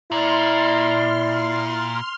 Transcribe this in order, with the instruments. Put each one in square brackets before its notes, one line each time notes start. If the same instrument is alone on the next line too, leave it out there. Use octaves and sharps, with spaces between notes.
[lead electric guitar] A#2 [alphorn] E4 [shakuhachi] D5 [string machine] C6 F6